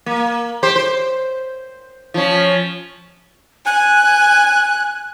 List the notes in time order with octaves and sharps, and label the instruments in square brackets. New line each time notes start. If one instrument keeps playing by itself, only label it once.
[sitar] A#3
G4 C5
C5
F3 C#4
[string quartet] G#5 [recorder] F#6